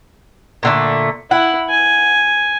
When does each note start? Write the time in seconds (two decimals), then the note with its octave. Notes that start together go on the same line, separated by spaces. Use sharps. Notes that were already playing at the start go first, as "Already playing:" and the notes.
0.63 A#2 D3 A3
1.31 E4 F#5
1.70 G#5